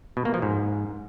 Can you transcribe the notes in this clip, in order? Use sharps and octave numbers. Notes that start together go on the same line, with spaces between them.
B2
A#3
F3
G#2